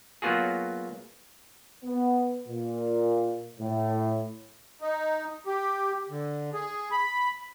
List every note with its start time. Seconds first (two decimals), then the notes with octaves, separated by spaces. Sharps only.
0.22 F#3 A#3 B3 F4 F#4 G#4
1.84 B3
2.48 A#2
3.60 A2
4.81 D#4
5.46 G4
6.09 D3
6.54 G#4
6.91 B5